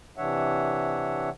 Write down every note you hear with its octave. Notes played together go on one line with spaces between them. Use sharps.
C3 E3 D4 C#5 E5 F#5